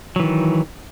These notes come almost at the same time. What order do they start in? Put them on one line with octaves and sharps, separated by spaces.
F#3 E3 D#3